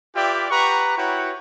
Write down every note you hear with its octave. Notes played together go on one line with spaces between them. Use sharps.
F4 G4 B4 D5 E5 G5
G4 B4 F#5 A#5 C#6
E4 F#4 B4 C#5 F#5 G5